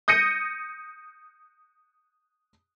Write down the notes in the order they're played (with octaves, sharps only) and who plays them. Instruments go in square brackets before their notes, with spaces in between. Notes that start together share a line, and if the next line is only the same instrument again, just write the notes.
[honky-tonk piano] D#6 G6 A#6 C#7 D#7